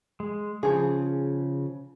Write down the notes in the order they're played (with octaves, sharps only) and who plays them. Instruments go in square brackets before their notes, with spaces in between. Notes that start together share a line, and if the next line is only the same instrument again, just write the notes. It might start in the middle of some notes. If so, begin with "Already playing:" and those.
[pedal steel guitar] G#3
[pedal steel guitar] C#3 [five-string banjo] F3 G#4